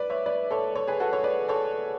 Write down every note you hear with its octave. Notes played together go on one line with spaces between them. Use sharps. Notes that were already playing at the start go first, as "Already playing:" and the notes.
Already playing: B4 D5
C#5 E5
B4 D5
A4 C#5
A4 C#5
G#4 B4
F#4 A4
A4 C#5
B4 D5
A4 C#5